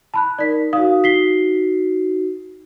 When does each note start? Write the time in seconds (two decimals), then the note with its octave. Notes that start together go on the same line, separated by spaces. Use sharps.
0.14 A5 B5 F#6
0.39 D#4 A#4 D5 B6
0.73 D#4 F#4 F5 D#6
1.04 B6 C7 G7